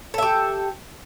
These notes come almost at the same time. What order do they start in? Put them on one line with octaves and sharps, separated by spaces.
A4 E5 G4